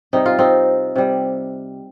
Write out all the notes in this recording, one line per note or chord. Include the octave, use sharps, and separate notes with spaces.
C3 G3 D#4
F4
C4 D#4
C3 G3